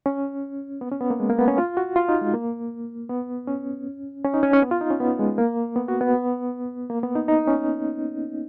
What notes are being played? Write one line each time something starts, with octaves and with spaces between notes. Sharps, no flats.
C#4
B3
C#4
B3
A#3
G#3
A#3
B3
C#4
F4
F#4
F4
D#4
G#3
A#3
B3
C#4
C#4
D#4
C#4
C#4
B3
F4
D#4
C#4
B3
G#3
A#3
B3
F#4
B3
A#3
B3
D#4
D#4
C#4